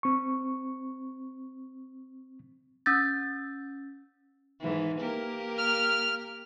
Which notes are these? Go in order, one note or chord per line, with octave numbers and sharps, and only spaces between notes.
C4 C#6
C#4 E6 G6 A6
G#2 D#3 E3
A#3 G4 A#4
F6